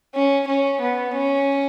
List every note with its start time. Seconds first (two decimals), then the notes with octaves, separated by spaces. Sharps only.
0.15 C#4
0.48 C#4
0.81 B3
1.13 C#4